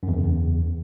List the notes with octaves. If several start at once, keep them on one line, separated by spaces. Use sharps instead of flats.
F#2
E2
F#2
C#3
E2